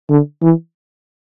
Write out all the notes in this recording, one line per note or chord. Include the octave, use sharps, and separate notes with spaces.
D3
E3